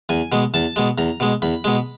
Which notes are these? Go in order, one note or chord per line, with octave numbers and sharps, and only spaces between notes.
E2 G#5
B2 G#3
E2 A5
B2 G#3
E2 A#5
B2 G#3
E2 B5
B2 G#3